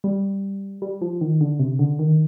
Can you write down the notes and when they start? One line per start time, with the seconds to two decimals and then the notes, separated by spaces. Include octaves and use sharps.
0.04 G3
0.82 G3
1.02 F3
1.21 D#3
1.41 D3
1.59 C3
1.79 D3
1.99 D#3